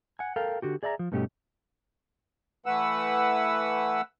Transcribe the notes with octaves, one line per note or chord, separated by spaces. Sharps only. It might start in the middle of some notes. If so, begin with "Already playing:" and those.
F#5 G#5
A4 A#4 F5 G5
D3 F#4 G4
G#4 D5 E5 G#5 A#5
F3
G2 B2 A3 C#4 D#4 G4
E3 A3 B4 F#5 E6